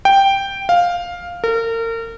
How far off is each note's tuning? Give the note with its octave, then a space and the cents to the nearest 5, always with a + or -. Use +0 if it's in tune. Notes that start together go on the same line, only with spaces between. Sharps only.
G5 +0
F5 +5
A#4 -35